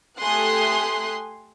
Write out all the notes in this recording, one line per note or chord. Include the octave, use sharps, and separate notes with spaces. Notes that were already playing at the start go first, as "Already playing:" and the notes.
A3 G4 G#5 C6 D#6 F#6